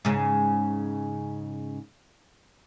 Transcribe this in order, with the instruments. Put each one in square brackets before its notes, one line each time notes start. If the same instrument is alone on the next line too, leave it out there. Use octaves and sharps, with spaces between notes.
[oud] G#2 C#3